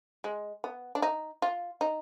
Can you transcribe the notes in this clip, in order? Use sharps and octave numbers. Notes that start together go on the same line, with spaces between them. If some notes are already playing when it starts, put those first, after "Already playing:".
G#3
B3
D4
D#4
F4
D#4